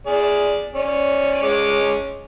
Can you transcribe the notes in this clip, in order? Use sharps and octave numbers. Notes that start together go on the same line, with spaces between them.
G#4 D5
C#4 D5
G#3 C#4 D6